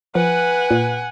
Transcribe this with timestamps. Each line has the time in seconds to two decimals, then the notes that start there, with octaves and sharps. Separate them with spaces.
0.15 F3 B4 F#5 G#5
0.71 A#2